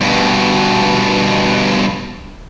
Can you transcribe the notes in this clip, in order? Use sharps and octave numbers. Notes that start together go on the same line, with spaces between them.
G2 B2